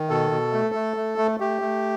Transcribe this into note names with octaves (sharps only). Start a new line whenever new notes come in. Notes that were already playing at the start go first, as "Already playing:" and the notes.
Already playing: D#3
B2 A4
B2
A3
A3
A3
A3
A3 G4
A3